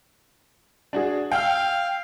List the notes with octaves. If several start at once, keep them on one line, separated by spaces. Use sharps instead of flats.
D4 F#4 G#4
F5 G5 E6 F6